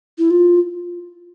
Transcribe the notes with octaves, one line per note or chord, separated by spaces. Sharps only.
E4
F4